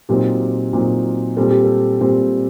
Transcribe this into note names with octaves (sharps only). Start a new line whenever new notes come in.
A#2 F#3 C4 D#4 G4
A#2 F#3 C4 D#4
A#2 G3 C4 A4
G4
A4
A#2 G3 C4